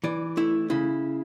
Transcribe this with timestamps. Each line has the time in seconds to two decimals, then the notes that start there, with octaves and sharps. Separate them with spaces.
0.04 E3 D5
0.37 A3 E4
0.70 C#3 E4